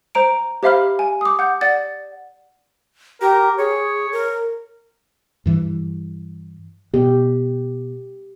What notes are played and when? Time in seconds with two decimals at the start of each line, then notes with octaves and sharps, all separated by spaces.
0.15 C5 A#5 D7
0.63 G4 C5 E5 F5 B5 F6
0.99 G#5
1.21 D6 D#6
1.39 F#5 G6
1.61 D5 F#5 A6
3.21 G4 A#4
3.58 G#4 C#5
4.12 A#4
5.46 G2 E3
6.94 B2 G4